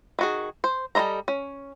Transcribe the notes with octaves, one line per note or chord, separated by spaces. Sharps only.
D#3 F#4 G#4
C5
G3 A4 C5 D#5 A#5
C#4